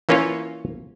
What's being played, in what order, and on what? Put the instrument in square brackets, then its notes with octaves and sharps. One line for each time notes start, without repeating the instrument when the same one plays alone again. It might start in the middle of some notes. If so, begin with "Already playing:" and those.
[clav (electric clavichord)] E3 A#3 C#4 F4 C#5